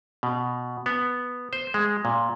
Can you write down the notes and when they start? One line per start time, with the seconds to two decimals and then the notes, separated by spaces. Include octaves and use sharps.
0.23 B2
0.86 B3
1.53 C5
1.74 G#3
2.05 A#2